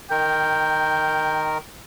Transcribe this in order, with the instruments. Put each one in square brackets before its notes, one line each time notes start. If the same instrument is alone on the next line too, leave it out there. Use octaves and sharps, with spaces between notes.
[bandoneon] D#3 A#4 [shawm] G5